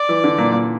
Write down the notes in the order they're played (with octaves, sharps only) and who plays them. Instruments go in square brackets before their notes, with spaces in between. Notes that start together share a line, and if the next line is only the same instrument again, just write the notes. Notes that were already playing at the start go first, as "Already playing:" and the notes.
Already playing: [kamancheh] D5
[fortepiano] E3
D3
A#2
A#2